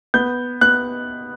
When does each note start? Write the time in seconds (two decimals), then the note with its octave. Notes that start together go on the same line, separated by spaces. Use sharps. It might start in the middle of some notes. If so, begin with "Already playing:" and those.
0.14 B3 G6
0.61 B3 F#6